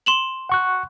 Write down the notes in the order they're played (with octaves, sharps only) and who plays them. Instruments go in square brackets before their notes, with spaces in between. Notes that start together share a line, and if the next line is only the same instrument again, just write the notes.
[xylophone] C6 E7 F#7
[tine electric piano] F#5 C#6 F#6